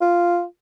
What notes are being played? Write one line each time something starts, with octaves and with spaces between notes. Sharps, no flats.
F4